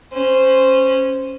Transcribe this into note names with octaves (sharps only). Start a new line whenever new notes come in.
C#4 C5